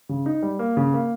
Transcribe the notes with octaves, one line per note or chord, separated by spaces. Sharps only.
C#3
D#4
G3
A#3
C#3
A#3